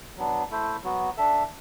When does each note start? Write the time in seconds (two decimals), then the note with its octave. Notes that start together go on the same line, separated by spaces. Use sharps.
0.17 F#3 B3 D4
0.51 A3 E4 A4 C5
0.83 F#3 B3 F#4
1.17 D4 A4 E5